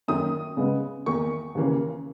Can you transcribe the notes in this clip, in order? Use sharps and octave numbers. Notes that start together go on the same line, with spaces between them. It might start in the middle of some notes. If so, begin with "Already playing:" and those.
F#2 D#3 A#3 D#6
C#3 G#3 B3
E2 D#3 A#3 C#6
D#2 C#3 E3 A#3 C#4